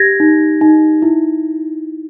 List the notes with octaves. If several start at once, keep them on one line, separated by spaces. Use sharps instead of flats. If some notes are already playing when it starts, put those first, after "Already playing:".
Already playing: G4 G#6 A#6
D#4
D#4
E4